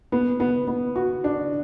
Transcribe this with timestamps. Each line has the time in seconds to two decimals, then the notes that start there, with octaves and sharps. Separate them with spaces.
0.12 B3
0.40 B3
0.68 B3
0.96 F#4
1.24 D4